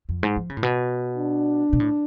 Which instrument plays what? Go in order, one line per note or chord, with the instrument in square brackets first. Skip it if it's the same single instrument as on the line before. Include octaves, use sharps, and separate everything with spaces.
[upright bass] F2
G#2
F3
C#3
A2
B2
[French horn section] D4
[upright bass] B2
A2